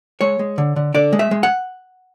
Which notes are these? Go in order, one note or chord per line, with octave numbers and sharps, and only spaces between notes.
G#3 C#5
G#3
D3
D3
D3 D5
G#3
E5
G#3
F#5